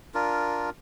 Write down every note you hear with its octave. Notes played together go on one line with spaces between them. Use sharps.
D4 F4 A#4